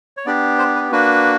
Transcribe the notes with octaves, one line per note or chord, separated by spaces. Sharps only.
C#5
B3 D4 G4 D5
C5
B4
A#3 D4 F#4 B4